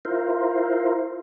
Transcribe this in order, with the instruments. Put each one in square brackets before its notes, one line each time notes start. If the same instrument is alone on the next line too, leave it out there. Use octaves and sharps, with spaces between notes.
[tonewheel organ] E4 F4 A#4 C5